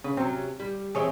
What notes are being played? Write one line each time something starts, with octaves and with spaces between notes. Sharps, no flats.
C#3 B4
C3 F#3 C4 C#4
G3
E3 F3 C4 G#4 C#5 D#5